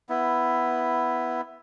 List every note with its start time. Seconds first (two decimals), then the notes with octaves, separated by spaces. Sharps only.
0.09 B3 E4